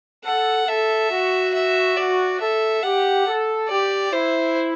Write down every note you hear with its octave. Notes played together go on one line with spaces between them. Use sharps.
A4 F#5
A4 E5
F#4
E5
F#4 D5
A4 E5
G4 F#5
A4
G4 D5
E4 C5